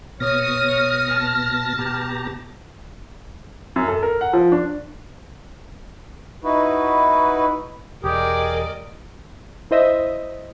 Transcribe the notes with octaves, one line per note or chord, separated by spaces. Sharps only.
B2 C#5 D#6 F6 A#6
A5
B2 G4 A#5
F#2
A4
A#4
F#5
F3
D4
D#4 E4 F#4 B4
E1 G4 G#4 A#4 D5 D#5
E4 C5 D#5 E5